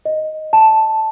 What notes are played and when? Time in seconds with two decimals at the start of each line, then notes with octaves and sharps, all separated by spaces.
0.05 D#5
0.53 A5